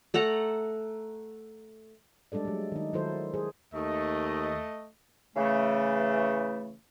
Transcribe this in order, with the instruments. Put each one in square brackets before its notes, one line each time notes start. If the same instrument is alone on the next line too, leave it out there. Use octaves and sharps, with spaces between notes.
[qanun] A3 A4 F#5 A#5
[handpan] G3 G#3 D4 A4 D5
F#3 A3
D#3 D#4
D#3 F#3 E4 A4 C5
G#4 C5
[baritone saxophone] D#2 [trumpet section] A3 D#5
[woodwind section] C#3 E3 A3